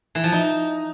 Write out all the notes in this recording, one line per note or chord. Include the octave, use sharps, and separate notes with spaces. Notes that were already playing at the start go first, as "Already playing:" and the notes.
E3
F3
D#4